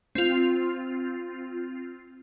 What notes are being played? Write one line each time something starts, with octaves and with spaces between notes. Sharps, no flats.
C4 F4